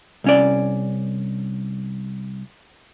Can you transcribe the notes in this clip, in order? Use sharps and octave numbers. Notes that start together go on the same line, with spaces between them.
C2 C#4 D5